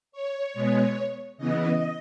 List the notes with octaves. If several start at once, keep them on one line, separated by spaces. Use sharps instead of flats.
C#5
B2 G#3 B3
C#3 E3 B3 D#5